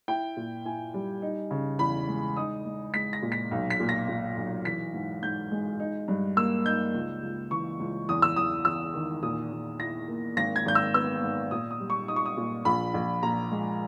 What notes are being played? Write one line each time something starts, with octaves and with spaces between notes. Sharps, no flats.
E4 G5
A#2
E4 G#5
G3
D#4
C#3
E2 B5
G#3
D#4 D#6
G#3
G#3 B6
A#6
A#2
B6
B1
B6
A#2
A#6
A#2
B1
E3 B6
G#2
G#2 G6
G#3
D#4
G2
A#3 E6
D#4 G6
C#2
C#2
E3 C#6
C#2
E2 D#6
E6
E2 D#6
E2 E6
D#3
A#2 D#6
A#2
E4 A#6
A#3
G#1 A#6
G#6
G#1 G6
E6
B3 E6
G#2
A#2 D#6
D#6
G3
C#6
D#4 D#6
C#6
D#6
A#2
A#1 B5
A#1
A#2 A#5
G#3